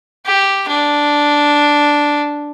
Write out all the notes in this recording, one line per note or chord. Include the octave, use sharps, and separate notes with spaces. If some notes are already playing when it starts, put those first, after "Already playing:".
G4
D4